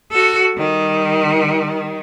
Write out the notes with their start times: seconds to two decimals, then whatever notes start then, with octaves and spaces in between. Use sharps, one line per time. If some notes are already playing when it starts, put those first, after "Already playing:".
0.11 F#4 A4
0.53 D#3 G3